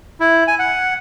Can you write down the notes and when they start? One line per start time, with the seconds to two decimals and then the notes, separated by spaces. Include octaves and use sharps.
0.20 E4
0.47 G#5
0.59 F#5